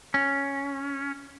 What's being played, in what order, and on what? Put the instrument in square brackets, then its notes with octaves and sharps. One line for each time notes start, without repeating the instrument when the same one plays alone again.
[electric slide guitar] C#4